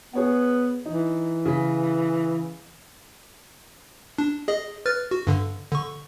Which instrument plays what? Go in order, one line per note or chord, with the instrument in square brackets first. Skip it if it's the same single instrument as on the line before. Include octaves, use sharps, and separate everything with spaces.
[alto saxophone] B3 [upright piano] G#4 C#5 F#5
[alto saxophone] E3 [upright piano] D#4
[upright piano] C#3 B6
[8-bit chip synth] D4
G#4 D#5
B4 F6 A6
F#4
G2 D3
D3 C#6